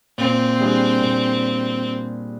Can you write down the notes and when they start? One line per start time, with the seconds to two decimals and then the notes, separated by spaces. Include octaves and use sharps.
0.18 A#2 C4
0.59 G3 D4 G#4
1.01 A#2